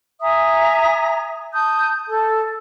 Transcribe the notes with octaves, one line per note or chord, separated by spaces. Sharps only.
E5 G#5 A#5 D#6
A5 D#6 G6
A4 A5